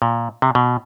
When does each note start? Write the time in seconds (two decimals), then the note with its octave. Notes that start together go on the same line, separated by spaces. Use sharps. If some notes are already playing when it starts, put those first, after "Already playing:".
0.02 A#2
0.42 C3
0.55 B2